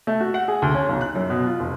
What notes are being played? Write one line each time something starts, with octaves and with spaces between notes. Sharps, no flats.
A3
F#4
F#5
G#4
D2
C#4
B1
F#6
F#2
B2
F4
F1